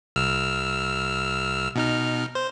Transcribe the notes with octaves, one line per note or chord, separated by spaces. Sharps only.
C2 E6 F6
B2 D#4 F6
C5